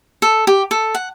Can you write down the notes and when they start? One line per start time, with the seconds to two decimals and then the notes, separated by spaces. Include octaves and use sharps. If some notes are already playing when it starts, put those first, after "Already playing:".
0.22 A4
0.47 G4
0.71 A4
0.95 F#5